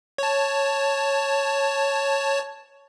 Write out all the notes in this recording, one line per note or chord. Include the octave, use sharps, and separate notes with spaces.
C#5 A5